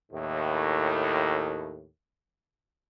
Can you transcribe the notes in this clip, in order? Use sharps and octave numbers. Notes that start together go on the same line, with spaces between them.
D#2 A2